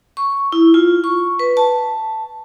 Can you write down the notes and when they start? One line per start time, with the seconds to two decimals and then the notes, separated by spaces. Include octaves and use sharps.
0.17 C#6
0.52 E4
0.74 F4
1.04 C#6
1.39 B4
1.57 A5